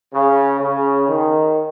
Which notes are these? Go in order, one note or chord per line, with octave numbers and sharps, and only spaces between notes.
C#3
C#3
D#3